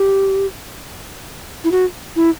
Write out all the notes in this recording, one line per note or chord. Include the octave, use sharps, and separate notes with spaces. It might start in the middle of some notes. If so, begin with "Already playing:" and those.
Already playing: G4
E4
F#4
E4